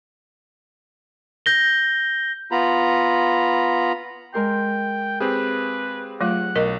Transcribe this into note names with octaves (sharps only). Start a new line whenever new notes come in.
G6 A#6 G7
B3 F4 A#5 B5
G#3 A#4 G5 C6
C4 G4 G#4 B4 F5
F#3 A3 F4 F#5
B1 A#4 D#5